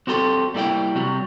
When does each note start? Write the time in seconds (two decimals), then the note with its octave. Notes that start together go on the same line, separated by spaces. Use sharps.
0.07 C4 F#4 G4 A4 C6
0.54 G3 A#3 E4 D5 G5
0.95 C3 F#3 G3